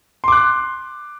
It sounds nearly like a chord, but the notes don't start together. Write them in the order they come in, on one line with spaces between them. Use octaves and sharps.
C6 D6 F#6